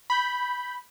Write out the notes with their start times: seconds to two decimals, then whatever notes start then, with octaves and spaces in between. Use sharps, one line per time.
0.10 B5 G6